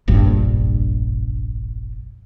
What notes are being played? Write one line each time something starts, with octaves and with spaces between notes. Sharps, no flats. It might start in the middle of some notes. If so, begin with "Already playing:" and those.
F1 A#1 G2